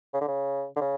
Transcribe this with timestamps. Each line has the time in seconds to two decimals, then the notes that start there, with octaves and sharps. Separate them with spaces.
0.14 C#3
0.21 D3
0.28 C#3
0.76 D3
0.81 C#3